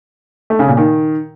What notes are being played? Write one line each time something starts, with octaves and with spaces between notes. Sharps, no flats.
A3
C#3
A#2
D#3